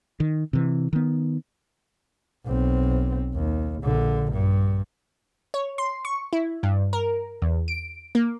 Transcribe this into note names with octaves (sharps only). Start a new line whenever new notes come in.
D#3
C3 E3
D#3 B3
B1 C4
D#2
A#1 D3
G2
C#5
C6
C#6
E4
G2
A#4
E2
D7
A#3